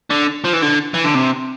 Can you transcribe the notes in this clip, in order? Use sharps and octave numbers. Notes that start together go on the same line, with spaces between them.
D3
F3
E3
D3
E3
D3
C3